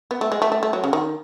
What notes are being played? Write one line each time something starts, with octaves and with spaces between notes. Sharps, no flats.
B3
A3
G#3
A3
A3
A3
F#3
C#3
D#3